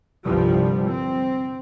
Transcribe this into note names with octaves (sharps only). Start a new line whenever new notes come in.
G1 C2 G2 F3 G3
C4